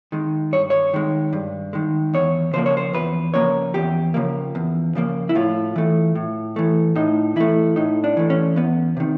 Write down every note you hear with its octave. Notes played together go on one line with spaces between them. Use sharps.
D#3 G#3
G2 C#5
C#5
D#3 G#3
G2
D#3 G#3
E2 C#5
C#3 F3 A#3 C5
C#5
C5
E2 B4
C#3 F3 A#3 C#5
E2 G4
C#3 F3 A#3
E2
C#3 F3 A#3
E4
A2 F4
E3 A3
A2
E3 A3
A2 D#4
E3 A3 E4
A2 D#4
D4
E3 A3
C#4
E2 B3
C3 D#3